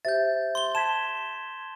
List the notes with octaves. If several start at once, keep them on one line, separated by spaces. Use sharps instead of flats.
G4 C5 E5 G6 A6
C6 G7
A5 G#6 B6 E7